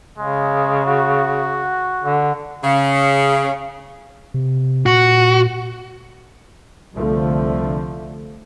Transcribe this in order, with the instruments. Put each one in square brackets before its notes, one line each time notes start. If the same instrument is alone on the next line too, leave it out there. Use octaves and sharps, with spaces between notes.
[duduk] C#3 [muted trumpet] G#3
[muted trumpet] F#4
[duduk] D3
[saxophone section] C#3
[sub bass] C3
[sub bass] A#2 [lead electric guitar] F#4
[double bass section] C2 D3 F3 A3